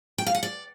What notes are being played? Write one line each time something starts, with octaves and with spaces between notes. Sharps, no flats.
G5
F5
F#5
D5